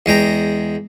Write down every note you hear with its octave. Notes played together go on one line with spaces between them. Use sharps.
E2 G#3 G5 A#5